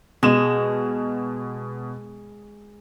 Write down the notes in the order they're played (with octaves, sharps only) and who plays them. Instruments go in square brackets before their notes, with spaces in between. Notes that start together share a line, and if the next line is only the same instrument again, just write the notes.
[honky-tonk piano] B2 E7 [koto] G#3